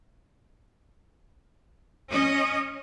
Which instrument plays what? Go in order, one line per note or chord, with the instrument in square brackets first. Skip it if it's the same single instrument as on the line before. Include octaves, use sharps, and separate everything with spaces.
[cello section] C#4 D#5